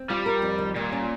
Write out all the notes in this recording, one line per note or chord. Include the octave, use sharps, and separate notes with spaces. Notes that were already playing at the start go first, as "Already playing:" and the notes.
Already playing: C4
G3 F4
A#4
F2
D#3
A#2 G3
C#4